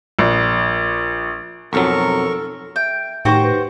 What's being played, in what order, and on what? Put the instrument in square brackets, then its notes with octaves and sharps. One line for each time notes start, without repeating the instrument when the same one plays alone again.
[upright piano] A#1
[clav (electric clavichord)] B1 F2 F#3 [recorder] A4 [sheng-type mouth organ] A#4 C#6
[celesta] E5 [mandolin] G5
[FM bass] A2 [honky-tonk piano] D#3 C#6 [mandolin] F#4 G4 C5 [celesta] G5
[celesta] B4